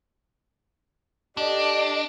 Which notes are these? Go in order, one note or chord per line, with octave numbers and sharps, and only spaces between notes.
D4 G4 A4 D5 D#5